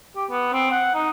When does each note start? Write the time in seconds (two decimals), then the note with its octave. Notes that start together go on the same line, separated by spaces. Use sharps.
0.16 G4
0.30 B3
0.53 C4
0.71 F#5
0.94 D#4